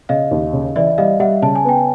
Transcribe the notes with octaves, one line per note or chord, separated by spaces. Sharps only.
C#3 D#5 F5
D#2
C#3
E3 D5 E5
G3 D#5 F5
G3 E5 F#5
C#3 A5
G#5
B3 G5